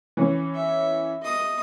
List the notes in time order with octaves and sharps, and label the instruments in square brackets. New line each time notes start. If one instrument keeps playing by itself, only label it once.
[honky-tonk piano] E3 C#4
[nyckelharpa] E5
D#5 D#6